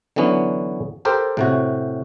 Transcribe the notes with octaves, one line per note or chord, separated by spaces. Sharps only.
D3 E3 F#3 B3 C#4
G4 A4 A#4 C5 G5
A2 C3 F#4